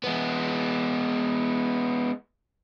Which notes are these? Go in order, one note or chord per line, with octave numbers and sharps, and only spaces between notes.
G#3 B3